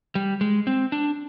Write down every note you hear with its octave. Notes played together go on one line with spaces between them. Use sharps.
G3
G#3
C4
D4